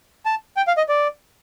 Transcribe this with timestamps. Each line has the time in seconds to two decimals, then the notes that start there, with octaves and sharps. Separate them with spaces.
0.25 A5
0.57 G5
0.67 F5
0.77 D#5
0.89 D5